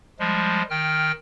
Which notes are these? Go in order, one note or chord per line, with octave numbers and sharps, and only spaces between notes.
F3 G3 G#3
D#3 G5 F6